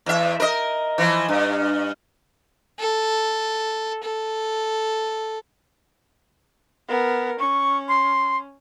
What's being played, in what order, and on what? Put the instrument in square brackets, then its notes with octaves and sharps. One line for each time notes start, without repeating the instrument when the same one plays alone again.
[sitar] E2 E5
A#4 D#5
E3 F3
G2
[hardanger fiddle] A4
A4
[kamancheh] B3 A#4
[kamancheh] C#4 [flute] C#6
[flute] C6